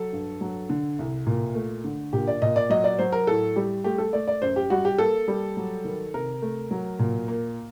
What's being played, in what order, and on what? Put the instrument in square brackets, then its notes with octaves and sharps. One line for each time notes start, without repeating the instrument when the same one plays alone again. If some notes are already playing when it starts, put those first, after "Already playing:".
Already playing: [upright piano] F#3 A4
G2
F#3
D3
C2
A#2
A3
D3
A#2 G4
D5
A#2 D#5
D5
F#3 D#5
D5
F#3 C5
A#4
A2 A4
G3 G4
A3 G4
A4
A3 D5
D5
F#2 C5
G4
G3 F#4
G4
A#3 A4
G3
F#3
D#3
C3 A#4
A3
F#3
A#2
A#3